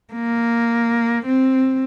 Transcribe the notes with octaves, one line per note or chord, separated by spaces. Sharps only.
A#3
C4